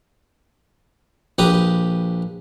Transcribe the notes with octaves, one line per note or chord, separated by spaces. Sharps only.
A#1 G4 B4 A#5 D#6